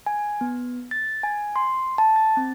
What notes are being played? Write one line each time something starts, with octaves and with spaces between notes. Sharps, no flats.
G#5
B3
A6
G#5
C6
A5
A6
C4